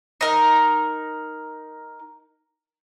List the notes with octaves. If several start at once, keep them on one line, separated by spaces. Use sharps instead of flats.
D#4 A#4